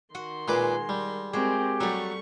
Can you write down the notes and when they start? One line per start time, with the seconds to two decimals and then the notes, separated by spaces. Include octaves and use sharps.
0.15 D#3 F#4 F#5 C6
0.48 A#2 G#3 B4 D6
0.89 G3
1.33 G#3 C4 F#4 G4 A#4
1.80 F#3 G3 A3 C#6